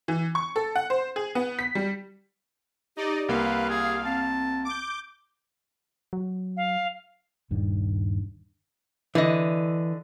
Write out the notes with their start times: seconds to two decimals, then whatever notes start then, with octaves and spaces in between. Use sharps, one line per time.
0.08 E3
0.35 C#6
0.56 A4
0.75 F#5
0.90 C5
1.16 G#4
1.35 B3
1.59 B6
1.75 G3
2.97 D#4 G4 D5 D#5
3.29 C2 A#3 B4 F5
3.70 G#4
4.05 C4 A5
4.65 D6 G6
6.13 F#3
6.57 F5
7.51 D#1 G2 D#3
9.15 D3 E3 D#5